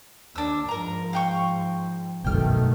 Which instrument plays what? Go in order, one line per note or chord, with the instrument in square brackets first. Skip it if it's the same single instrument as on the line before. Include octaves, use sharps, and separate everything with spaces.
[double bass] D#2 [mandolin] D4 E6
[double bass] G#2 F3 [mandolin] A#4 A#5
[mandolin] F5 G5 C#6
[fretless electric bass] G1 C2 F#2 [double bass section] B2 D#3 A3 [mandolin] G5 F6